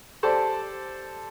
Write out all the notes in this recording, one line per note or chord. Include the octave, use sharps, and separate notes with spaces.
G4 A4 C5 D5 A5